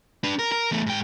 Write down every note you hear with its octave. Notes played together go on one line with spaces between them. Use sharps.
D4 B4
A#4
A#4
E2 A3
G#2 G5